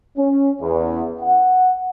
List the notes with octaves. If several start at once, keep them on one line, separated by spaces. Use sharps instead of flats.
C#4
E2
F#5